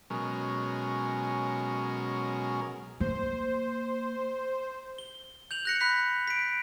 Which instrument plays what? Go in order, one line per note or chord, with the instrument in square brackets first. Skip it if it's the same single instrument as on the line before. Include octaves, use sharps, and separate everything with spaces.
[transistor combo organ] B2 F#3 G#3 C#4 A#4
[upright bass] A#3 [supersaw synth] C5
[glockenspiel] G7
G6 F7 F#7
F#6 A#6 C#7
B5 F#6 B6
B6 D7